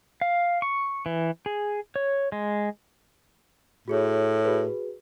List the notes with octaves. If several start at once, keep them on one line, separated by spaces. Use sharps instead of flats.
F5
C#6
E3
G#4
C#5
G#3
A2 F#4 G#4 C#5
F#4 G#4 B4